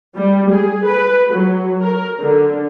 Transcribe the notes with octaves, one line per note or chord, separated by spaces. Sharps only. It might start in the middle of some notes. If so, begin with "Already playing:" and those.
G3
G#4
B4
F#3
A#4
D3